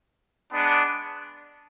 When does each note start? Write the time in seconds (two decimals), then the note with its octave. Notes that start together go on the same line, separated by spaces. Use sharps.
0.53 G#3 B3 D4